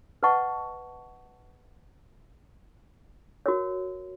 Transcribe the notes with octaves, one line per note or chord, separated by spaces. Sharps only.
B4 D#5 F#5 A5 C#6
F#4 A#4 C#5